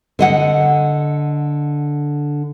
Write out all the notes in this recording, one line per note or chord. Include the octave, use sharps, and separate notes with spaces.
D3 D#5 F#5